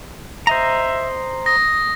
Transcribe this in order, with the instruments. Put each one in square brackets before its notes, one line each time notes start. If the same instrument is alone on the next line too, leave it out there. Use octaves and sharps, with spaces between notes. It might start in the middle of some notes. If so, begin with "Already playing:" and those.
[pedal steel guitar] C5 D#5 A#5 [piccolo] E5
[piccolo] D#6 [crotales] A#6